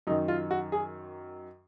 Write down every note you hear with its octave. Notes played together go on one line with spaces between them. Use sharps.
F#2 D#3 D#4
F4
F#4
G#4